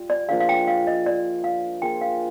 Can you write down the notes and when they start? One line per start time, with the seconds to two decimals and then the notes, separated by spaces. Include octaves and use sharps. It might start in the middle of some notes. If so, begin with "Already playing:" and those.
Already playing: G3 F4
0.10 D5
0.29 F3 A#3 D4 G#4 F5
0.40 F5
0.49 G5
0.68 F5
0.87 D#5
1.06 D5
1.44 F5
1.82 A#3 F4 G#4 G5
2.01 F5